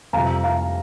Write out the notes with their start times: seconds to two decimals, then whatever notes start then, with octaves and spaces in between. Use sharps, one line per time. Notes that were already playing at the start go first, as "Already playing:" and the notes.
0.13 F2 C3 G3 F5 A#5
0.44 F5 A#5